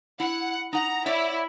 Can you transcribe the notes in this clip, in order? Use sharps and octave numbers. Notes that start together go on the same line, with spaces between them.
E4 F#5
D#4 F#5 A#5
E4 C#5 D5 E5